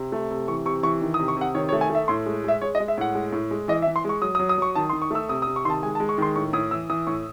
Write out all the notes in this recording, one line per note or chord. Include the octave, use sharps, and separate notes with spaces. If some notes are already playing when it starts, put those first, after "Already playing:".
Already playing: C3
A3
C3
E3 C#6
C3 C#6
E3 C#6
D#3
D#6
C3
C#6
C3 F#5
D#3 C#5
C#5
A3
G#5
A3 E5
A2 C6
G#3
G#3 E5
G#3 C#5
D#5
G#3
E5
A2 F#5
G#3
A2
G#3
E3 D#5
E5
E3
C6
G#3 C#6
F#3 D#6
D#6
F#3
D#6
F#3 C#6
D#3 A5
C6
D#3
C#6
A3 E6
C3 D#6
D#6
C3
C#6
D#3 A5 C6
G#3 G#5
A5
G#3
C#6
D#3 C6
A2 C#6
A2 D#6
E3 E6
E3 D#6
A2 C#6